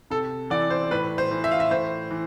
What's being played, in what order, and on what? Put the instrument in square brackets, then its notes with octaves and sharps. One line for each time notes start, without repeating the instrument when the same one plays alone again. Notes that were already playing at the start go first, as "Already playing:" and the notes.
[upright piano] C3 A4
E3 D5
C5
A2 B4
C5
E3
E5
F5
E5
A2 C5
E3